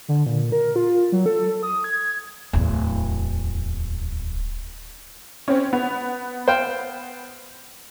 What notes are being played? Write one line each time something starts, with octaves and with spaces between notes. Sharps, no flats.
D3
A#2
A#4
F4
F#3
A4
D#6
G#6
D1 E2
C4 C#4
B3
C5 F5 G5